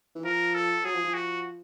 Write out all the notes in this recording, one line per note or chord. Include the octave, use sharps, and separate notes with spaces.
E3
F3 A#4
A4
F#3 G#4
F3
F3
F#4